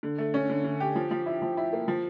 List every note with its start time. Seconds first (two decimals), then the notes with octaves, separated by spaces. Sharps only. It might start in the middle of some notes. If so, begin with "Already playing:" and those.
0.03 D3
0.18 A3
0.34 C#4
0.50 D3
0.64 D3
0.80 G4
0.95 F3
1.11 F3
1.26 E4
1.42 F3
1.57 E4
1.73 A#3
1.88 F3